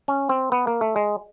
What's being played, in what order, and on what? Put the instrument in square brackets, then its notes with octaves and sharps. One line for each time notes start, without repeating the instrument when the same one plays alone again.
[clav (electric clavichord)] C#4
C4
B3
A#3
A3
G#3